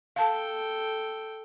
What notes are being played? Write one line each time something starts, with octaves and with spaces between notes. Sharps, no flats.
A4 F5 G5 A5